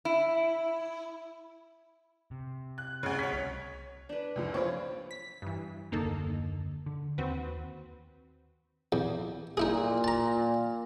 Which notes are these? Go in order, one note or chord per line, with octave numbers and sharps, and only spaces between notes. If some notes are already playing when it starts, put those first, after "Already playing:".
E4
C3
F#6
D2 C#3
C#5 B6
C2
D4 B4
C#2 F#2 F3
C4 F4 C#5 D5 B5
B6
G2 E3
F#1 D#2 D3 A#3 D#4 A4
D3
D#2 C4 F#4 B4
E2
A#2 D#4 E4 G#4
A5 A#5